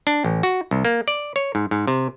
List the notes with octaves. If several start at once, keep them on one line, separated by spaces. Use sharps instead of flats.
D4
A1
F#4
C2
A#3
D5
C#5
G#2
G#2
C3